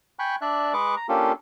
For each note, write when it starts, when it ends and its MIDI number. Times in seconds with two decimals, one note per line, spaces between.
0.19 0.36 79
0.19 0.36 80
0.19 0.36 83
0.19 0.36 85
0.19 0.36 90
0.41 0.73 62
0.41 0.73 74
0.41 0.73 76
0.41 0.73 90
0.73 0.95 56
0.73 0.95 68
0.73 0.95 71
0.73 0.95 85
0.73 0.95 86
0.73 0.95 90
0.97 1.07 82
1.09 1.32 58
1.09 1.32 61
1.09 1.32 62
1.09 1.32 65
1.09 1.32 67
1.09 1.32 69